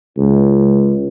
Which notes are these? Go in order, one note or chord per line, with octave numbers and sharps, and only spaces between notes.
C#2